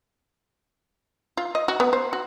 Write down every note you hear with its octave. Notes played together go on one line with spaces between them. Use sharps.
F4
D#5
F#4
B3
C5
F#4